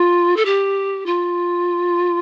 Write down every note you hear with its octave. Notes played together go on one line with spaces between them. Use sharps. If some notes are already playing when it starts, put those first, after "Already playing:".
Already playing: F4
A4
G4
F4